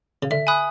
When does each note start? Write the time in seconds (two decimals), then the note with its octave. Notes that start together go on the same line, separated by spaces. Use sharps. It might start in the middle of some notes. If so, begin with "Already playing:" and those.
0.23 C#3
0.31 D3 E5
0.47 G#5 B5 D#6 F#6